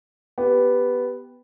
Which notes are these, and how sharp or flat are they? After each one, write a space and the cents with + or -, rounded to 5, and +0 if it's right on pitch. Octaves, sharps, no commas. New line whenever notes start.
B3 +0 G4 +0